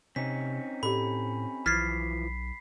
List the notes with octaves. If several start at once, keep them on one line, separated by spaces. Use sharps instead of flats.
C3 C4 C#4 D#4 B6
A2 G4 A4 B5
B1 E3 F3 F6 G#6 A6 B6 C7